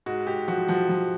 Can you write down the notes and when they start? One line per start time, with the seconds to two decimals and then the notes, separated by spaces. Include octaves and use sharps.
0.06 G#2 F#4
0.27 G#2 G4
0.48 F3 F#4
0.68 F3 F#4
0.89 F3